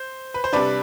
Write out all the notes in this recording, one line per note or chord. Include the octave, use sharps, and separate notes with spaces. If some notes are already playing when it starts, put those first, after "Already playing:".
Already playing: C5
B4
C5
C3 G3 D4 B4 D5